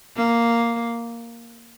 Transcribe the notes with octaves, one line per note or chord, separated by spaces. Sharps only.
A#3